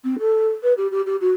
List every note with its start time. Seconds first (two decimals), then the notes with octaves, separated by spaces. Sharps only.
0.04 C4
0.19 A4
0.63 B4
0.77 G4
0.91 G4
1.06 G4
1.20 F#4